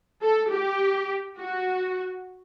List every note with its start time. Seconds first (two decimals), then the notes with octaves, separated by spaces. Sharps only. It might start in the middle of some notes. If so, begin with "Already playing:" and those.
0.22 A4
0.52 G4
1.38 F#4